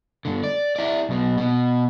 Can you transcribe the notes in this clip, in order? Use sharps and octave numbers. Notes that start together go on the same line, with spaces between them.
G2 D3
D5
E4 D5
B1 B2
B2